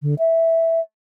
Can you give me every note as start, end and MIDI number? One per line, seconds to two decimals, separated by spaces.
0.02 0.15 50
0.19 0.80 76